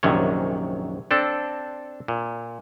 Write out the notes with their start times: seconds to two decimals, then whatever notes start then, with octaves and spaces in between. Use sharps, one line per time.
0.03 A#1 F#2 C3 D#3 C#5
1.11 C4 D4 A4
2.08 A#2